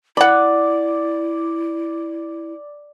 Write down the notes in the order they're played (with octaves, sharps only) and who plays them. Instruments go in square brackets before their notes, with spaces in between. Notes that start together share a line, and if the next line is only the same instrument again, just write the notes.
[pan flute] E4 [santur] D5 [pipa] F#5 B5